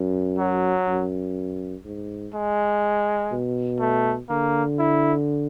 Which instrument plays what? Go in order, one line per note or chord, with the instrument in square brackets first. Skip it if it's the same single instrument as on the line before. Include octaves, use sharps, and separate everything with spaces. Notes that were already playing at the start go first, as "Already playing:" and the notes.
Already playing: [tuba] F#2
[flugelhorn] F#3
[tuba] F#2
G#2
[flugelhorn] G#3
[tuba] B2
[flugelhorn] A3
[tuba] D3 [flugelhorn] A#3
[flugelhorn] E4